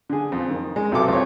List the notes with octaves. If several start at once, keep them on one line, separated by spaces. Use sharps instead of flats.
D3 G#4
F2
D#3
G#3
B1 C3 F#3 A4 D6
F2 C#5